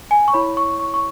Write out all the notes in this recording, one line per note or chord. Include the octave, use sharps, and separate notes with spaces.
G#5
C#6
E4 C#5 B5
C#6
C#6
C#6